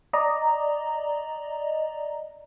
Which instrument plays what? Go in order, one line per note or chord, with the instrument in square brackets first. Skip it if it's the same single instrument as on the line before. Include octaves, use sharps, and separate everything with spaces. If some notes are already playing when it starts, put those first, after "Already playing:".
[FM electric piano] D5 D#5 A#5